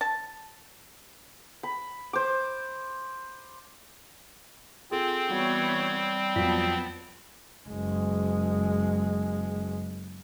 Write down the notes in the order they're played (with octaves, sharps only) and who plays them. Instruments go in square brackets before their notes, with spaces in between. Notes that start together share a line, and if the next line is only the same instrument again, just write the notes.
[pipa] A5
[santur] B5
C5 D6
[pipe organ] C4 [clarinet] F4 [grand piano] G#4 A4 G#5
[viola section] E3 B3 C#5 [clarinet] G3 [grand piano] F#4
[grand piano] F2 F#3 B6 [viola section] B3 A5
[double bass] F#1 G#3